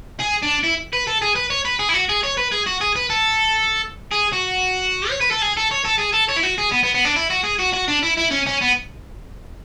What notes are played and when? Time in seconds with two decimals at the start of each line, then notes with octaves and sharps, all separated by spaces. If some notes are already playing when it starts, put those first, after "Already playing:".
0.20 G#4
0.43 D4
0.63 E4
0.93 B4
1.07 A4
1.22 G#4
1.35 B4
1.50 C#5
1.65 B4
1.79 G#4
1.89 E4
1.94 F#4
2.09 G#4
2.23 C#5
2.37 B4
2.52 G#4
2.66 F#4
2.81 G#4
2.96 B4
3.10 A4
4.12 G#4
4.33 F#4
5.09 C#5
5.20 B4
5.31 A4
5.42 G#4
5.57 A4
5.71 C#5
5.85 A4
5.99 G#4
6.14 A4
6.29 C#5
6.37 E4
6.43 F#4
6.58 G#4
6.72 B3
6.83 B3
6.94 B3
7.05 D4
7.16 E4
7.30 F#4
7.44 G#4
7.59 F#4
7.74 F#4
7.88 D4
8.03 E4
8.17 E4
8.31 C#4
8.46 C#4
8.61 B3